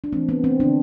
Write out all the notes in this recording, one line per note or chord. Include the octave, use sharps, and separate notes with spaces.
D4
E3 A3 C4
B3
C4
D3 F3 B3 D4